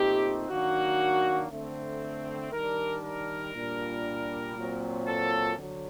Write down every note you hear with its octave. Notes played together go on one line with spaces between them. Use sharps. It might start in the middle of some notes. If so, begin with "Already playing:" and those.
Already playing: A#2 A3 C4 D#4 G4
D#3 F#3 A#3 D4 F#4
D3 A3 C4
D#3 G3 D4 A#4
A#4
A#2 G3 D4
A#2 F#3 C4
A4
D3 F#3